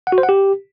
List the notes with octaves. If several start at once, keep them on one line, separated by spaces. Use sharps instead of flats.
F#5
F#4
C5
F#5
G4